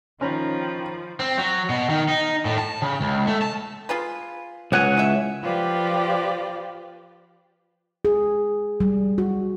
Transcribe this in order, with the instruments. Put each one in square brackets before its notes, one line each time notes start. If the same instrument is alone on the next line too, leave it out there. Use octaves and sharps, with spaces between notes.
[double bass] D#3 [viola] F3 [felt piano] C#4 [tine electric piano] C5 A#5 B5
[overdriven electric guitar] C4
F#3
B2
D#3
D#4
A2
A5
C#3
C#2
A3
A5
[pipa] F4 G#4 B4
[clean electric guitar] C#2 F#5 G#5 [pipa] B3 C#4 C#5
[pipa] E4 E5
[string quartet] F3 F4 G4 B4 C5 D5
[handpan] G#4
G3
F#4